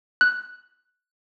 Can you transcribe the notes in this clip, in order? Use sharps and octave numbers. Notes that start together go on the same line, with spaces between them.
F#6